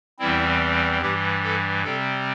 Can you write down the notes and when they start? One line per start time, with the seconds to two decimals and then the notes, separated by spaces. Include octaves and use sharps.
0.19 E2 E3 G3 C4 E4
1.01 G2 E3 G3 G4
1.43 A4
1.84 C3 G3 C4 A4